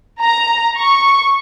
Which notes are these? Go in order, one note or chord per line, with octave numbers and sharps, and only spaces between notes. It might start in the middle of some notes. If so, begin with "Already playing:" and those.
A#5
C#6